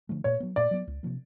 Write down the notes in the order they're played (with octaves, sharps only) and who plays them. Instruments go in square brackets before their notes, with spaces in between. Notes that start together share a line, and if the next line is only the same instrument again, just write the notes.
[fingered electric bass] D3 F3 A3
[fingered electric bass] A#2 [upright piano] C#5
[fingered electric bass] F#3 B3
[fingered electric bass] A#2 [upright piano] D5
[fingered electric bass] F#3 B3
C#2
C3 F3 A#3